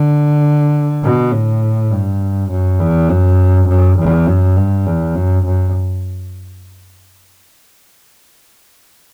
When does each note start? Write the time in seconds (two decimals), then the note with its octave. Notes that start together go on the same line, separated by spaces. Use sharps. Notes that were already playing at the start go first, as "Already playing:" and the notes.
Already playing: D3
1.03 B2
1.32 A2
1.91 G2
2.50 F#2
2.79 E2
3.09 F#2
3.68 F#2
3.98 E2
4.27 F#2
4.57 G2
4.87 E2
5.15 F#2
5.45 F#2